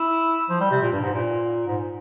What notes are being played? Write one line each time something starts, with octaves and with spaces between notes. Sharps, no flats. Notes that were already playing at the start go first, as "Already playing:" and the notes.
Already playing: E4
F3
G3
C3
A#2
G2
G#2
A#2
G#2